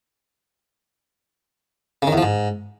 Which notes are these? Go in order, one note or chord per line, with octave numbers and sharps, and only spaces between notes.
C#3
D#3
E2
F3
G#2